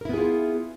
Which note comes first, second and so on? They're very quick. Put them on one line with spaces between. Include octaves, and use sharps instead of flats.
A#4 E4 B3 G#4 F4